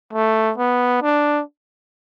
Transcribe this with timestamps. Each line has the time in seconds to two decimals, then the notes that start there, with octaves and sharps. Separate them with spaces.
0.13 A3
0.58 B3
1.02 D4